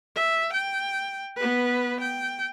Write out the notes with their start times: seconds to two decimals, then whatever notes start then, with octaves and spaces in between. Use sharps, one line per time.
0.16 E5
0.53 G5
1.37 B3 B4
2.01 G5